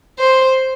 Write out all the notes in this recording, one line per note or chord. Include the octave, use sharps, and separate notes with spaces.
C5